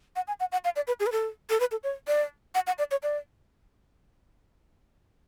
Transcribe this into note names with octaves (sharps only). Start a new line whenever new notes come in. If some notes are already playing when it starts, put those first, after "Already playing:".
F#5
G#5
F#5
F#5
F5
D5
B4
G#4
B4
A4
A4
B4
A4
C#5
D5
F#5
F#5
D5
C#5
D5